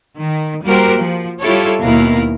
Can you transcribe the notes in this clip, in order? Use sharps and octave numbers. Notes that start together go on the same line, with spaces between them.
D#3
G3 A#3 F#4 G4 A#4 C5
F3
G3 E4 F4 G4 A4 C#5
D#2 B2 B3 E4 A#4 F5